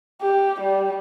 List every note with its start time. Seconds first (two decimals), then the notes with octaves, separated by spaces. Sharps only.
0.22 G4
0.62 G3